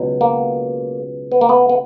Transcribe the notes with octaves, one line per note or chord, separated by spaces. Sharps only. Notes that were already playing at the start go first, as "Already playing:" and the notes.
Already playing: C#2 B2 F#3
A#3
B3
A#3
B3
B3